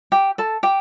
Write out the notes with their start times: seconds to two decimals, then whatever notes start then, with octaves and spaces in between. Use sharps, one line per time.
0.12 G4 G5
0.38 A4 A5
0.63 G4 G5